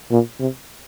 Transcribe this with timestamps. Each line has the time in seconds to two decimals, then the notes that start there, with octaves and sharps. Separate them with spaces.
0.11 A#2
0.39 C3